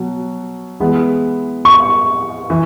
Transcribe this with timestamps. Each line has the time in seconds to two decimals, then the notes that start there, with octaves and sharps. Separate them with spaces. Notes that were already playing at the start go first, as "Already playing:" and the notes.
Already playing: B2 F#3
0.80 E3 G#3 B3
1.65 C#6
2.50 E3